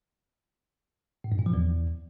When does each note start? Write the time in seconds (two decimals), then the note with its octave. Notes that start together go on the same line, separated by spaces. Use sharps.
1.24 A2
1.32 G2
1.39 A#2
1.46 F3
1.54 E2